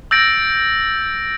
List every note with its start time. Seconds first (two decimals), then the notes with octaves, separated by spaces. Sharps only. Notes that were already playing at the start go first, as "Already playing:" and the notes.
0.11 E6 G6 A6 A#6 D7